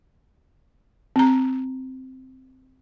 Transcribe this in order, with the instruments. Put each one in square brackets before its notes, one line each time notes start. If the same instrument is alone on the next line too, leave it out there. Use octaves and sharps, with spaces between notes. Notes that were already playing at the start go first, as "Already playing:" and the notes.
[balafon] C4 A#5